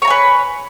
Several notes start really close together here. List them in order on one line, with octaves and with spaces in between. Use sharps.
C#5 A#5 G#5 B4